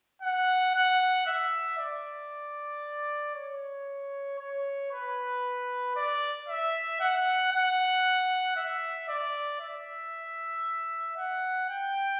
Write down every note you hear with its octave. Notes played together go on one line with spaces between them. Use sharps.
F#5
F#5
E5
D5
C#5
C#5
B4
D5
E5
F#5
F#5
E5
D5
E5
F#5
G5